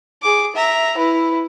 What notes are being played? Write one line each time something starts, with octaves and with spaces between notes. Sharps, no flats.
G#4 D6
E5 A#5
E4 B4